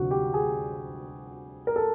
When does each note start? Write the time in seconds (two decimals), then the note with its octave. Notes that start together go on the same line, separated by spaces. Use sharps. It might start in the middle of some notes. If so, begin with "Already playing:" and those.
Already playing: D2 C3 F3 F#4
0.11 G4
0.34 G#4
1.67 A#4
1.76 A4